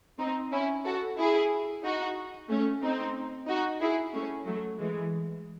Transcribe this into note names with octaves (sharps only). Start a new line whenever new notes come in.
C4 D#4
C#4 E4
F#4 A4
E4 G#4
D#4 F#4
A3 C#4
C4 D#4
D#4 F#4
E4 G#4
A3 C#4
F#3 A3
E3 G#3